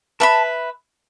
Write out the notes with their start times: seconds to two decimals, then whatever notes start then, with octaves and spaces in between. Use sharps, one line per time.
0.20 B4 E5 A5 B5